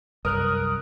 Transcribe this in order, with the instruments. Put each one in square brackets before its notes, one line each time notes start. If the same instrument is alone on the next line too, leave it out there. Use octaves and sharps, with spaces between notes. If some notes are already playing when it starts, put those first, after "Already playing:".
[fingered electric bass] C2 [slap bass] F#2 [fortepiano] A#4 [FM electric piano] D#6 F6 F#6